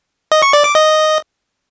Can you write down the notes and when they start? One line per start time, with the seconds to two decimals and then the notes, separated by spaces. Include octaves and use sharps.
0.32 D#5
0.42 C#6
0.53 D5
0.64 D6
0.75 D#5